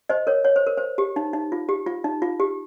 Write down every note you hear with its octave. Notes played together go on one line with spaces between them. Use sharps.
C5 D#5
A#4 C#5
C#5
C5
A#4
C5
G4
D#4
D#4
F4
G4
F4
D#4
F4
G4